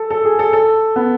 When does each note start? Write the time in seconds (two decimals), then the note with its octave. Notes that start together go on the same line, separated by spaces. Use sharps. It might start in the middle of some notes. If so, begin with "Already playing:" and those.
Already playing: A4
0.10 A4
0.25 G#4
0.39 A4
0.53 A4
0.96 B3